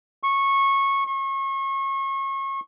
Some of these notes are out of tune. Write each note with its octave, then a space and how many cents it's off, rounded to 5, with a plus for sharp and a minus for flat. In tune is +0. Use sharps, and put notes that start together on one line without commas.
C#6 -15
C#6 -35